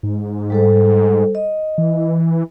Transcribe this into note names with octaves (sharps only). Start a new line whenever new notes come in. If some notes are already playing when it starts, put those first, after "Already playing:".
G#2
G3 A4 C5
D#5
E3